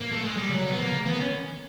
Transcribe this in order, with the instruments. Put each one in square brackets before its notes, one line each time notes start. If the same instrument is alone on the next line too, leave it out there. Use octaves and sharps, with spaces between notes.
[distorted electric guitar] A#3
A3
G#3
G3
[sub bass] C#3 [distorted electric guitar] F#3
[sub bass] D3
[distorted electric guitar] B3
[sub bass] F3 [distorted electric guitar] A#3
[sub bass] C#3
[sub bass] E3 [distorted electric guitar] B3
[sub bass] D#3
[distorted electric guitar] C#4